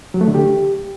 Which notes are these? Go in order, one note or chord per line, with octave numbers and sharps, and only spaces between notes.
F#3
A3
D3
G4